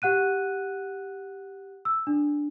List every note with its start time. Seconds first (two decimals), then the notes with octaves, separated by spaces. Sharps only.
0.02 G4 F#5 F#6 D#7
1.85 E6
2.07 D4